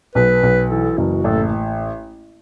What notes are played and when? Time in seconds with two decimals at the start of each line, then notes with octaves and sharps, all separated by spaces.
0.15 B1 B4
0.43 B1
0.70 E3 A4
0.98 F#1 F#4
1.24 A1 A4